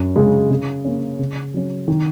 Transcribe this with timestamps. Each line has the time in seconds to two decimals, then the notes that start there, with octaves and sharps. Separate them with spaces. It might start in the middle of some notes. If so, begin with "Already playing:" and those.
Already playing: F#2
0.16 C#3 G#3
0.50 C#3
0.85 A#3 C#4
1.19 C#3
1.54 F#3 C#4
1.88 D#3